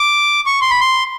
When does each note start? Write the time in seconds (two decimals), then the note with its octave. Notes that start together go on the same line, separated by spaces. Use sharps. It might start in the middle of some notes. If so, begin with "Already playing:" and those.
Already playing: D6
0.46 C#6
0.61 C6
0.71 B5
0.81 C6